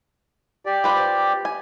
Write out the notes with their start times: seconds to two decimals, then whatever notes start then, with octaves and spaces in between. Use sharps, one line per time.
0.66 G4 D5
0.84 F4 B4 C5
1.45 G#5